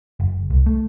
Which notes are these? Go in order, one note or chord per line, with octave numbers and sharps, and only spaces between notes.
F#1
C2
A3